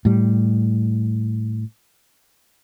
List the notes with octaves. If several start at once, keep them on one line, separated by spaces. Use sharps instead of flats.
A2 G3